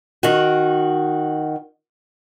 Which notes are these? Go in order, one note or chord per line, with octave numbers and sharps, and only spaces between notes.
D#3 F#4